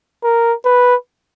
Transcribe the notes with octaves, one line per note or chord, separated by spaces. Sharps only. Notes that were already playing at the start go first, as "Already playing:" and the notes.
A#4
B4